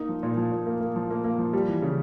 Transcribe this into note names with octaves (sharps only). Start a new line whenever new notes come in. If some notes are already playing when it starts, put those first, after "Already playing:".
Already playing: A#3 D#4
F3
A#2
F3
A#2
A#3
A#3
F3
A#3
A#3
F3
G3
E3
C#3